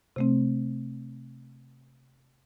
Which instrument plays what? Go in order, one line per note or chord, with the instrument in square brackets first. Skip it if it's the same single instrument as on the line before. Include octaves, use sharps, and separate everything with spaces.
[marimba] C3 A3 C4